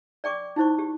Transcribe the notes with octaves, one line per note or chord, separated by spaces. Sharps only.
D5 G5 C#6 D6
D#4 E4 C5 C#6
G4